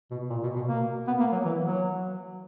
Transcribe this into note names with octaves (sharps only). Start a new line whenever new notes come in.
B2
A#2
B2
B2
A#3
B3
A#3
F#3
E3
F#3